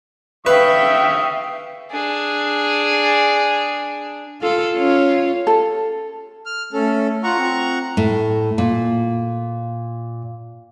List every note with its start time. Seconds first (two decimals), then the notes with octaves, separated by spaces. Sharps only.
0.46 B4 E5 F5 G5 C#6 D#6
1.92 D4 G#4
4.41 F4 A4
4.76 C#4 F4 C#5
5.47 A4
6.46 F6
6.73 A3 C#4 A4
7.23 F4 F#5 A#5 C#6
7.40 C4
7.97 A2
8.58 A#2